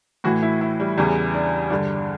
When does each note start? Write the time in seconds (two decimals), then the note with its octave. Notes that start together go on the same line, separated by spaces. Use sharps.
0.24 A2 E3 F#4
0.43 E4
0.61 E4
0.80 G3
0.97 E2 C#3 E3 G3
1.34 D4
1.70 G2 D3 D4